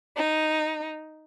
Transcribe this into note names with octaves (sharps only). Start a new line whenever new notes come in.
D#4